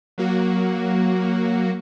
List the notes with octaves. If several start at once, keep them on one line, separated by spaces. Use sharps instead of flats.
F#3 A#3 F#4